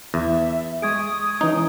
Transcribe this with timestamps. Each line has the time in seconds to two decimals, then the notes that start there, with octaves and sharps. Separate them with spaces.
0.14 E2 E5
0.82 G#3 G#4 C#6 D#6 G#6 D7
1.41 E3 C#4 D#4